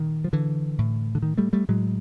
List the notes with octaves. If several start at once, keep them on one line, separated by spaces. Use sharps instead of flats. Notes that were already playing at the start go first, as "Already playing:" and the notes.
Already playing: A#2 D#3
F3
D3 E3
A2
D3
D#3
G3 A3
G3 A3
A2 F#3 G#3